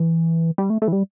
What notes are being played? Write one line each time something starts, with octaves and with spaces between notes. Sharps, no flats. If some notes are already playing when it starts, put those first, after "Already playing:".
Already playing: E3
G3
A3
A3
E3
G3